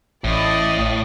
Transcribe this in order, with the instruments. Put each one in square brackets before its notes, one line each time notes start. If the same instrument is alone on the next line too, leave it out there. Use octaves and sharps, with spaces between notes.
[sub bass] A1 [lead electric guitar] A2 [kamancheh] D5 D#5